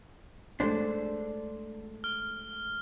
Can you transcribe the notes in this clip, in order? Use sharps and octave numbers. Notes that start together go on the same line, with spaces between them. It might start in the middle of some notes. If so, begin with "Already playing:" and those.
G#3 A3 D4 A4 C5
F6